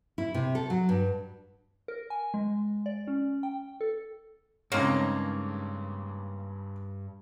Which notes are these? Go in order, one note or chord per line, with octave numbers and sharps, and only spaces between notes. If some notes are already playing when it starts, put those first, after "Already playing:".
E4
C3
A4
F#3
G2
A#4
G#5
G#3
D5
C#4
G5
A4
G2 C#3 G#3 A#3 C4 D#4 C#5